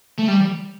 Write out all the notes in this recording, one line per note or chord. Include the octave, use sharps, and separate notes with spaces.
A3
G3